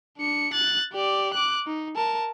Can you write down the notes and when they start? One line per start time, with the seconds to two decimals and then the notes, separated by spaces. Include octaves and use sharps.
0.18 D4 C#7
0.53 F#6 A6
0.92 G4 D5
1.34 D6 F#6
1.67 D#4
1.96 A#4 A5